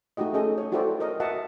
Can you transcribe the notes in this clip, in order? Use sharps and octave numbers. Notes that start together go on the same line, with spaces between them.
A3 D#4 F#4 G4 D#5
C#4 G#4 A4 D#5
C#5
E4 F#4 G4 A4 C5 D5
A#4 C#5 D#5
F#4 A#4 D#5 E5 F#5 A5